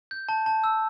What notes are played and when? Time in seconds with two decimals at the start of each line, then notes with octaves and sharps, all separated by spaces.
0.11 G6
0.29 A5
0.46 A5
0.64 E6